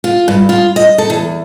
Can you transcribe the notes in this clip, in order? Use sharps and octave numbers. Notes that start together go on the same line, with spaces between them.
F4
G2
F4
D#5
A4
E2